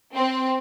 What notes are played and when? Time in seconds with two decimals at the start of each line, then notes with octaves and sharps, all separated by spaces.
0.14 C4